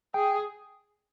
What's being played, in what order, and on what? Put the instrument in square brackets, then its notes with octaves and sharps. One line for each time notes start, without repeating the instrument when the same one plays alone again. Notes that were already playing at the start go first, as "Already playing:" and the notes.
[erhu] G#4 [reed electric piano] G5